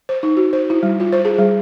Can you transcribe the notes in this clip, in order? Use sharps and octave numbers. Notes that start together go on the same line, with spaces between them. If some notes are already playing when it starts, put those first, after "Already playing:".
C5
D#4
F#4
C5
E4
G3
F4
C5
G#4
G3